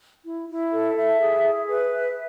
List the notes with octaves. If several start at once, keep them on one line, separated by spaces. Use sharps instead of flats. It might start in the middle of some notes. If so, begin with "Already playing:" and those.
E4
E4
A4
E5
G#4
G#4
B4
E5